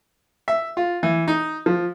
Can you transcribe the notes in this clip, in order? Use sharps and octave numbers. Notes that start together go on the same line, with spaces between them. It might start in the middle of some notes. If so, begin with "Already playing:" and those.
E5
F4
E3
D#4
F3